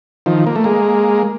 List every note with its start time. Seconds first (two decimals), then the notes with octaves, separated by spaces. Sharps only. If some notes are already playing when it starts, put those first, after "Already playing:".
0.26 D#3 F3
0.47 A#3
0.56 A3
0.64 G#3 A#3